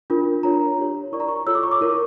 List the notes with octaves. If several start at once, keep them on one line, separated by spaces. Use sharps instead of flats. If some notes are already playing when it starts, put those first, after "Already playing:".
D4 F4 A#4
D4 F4 A#4 C#5 A#5
D4 G4 C#5
E4 A#4 D5 C#6
A#5
C#6
F4 A4 C#5 E6
D6
C#6
D6
E4 A#4 C#5